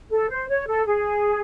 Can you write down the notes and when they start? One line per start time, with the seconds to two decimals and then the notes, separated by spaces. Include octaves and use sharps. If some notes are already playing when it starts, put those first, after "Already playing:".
0.10 A4
0.30 C5
0.48 C#5
0.67 A4
0.85 G#4